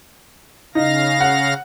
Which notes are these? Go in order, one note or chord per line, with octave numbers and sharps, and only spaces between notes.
C#3 D#4 F5 A#6
F#5